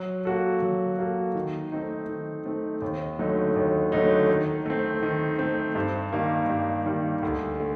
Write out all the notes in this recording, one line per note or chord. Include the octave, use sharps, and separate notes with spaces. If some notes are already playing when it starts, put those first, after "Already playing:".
Already playing: F#3
A#3 F#4 A4
F#3
A#3 F#4 A4
D#3
A3 C4 D#4
D#3
A3 C4 D#4
D#2
D3 F#3 A3 D#4
D#2
D3 F#3 A3 D#4
D#3
A3 C4
D#3
A3 C4
G2
D#3 G3 A#3
G2
D#3 G3 A#3
D2
D3 A3